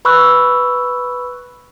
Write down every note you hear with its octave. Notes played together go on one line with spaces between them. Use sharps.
B4 B5 C#6 E6 F#6